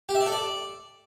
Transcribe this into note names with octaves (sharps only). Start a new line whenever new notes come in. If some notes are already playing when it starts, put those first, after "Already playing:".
G4
E5
D5
A4
D5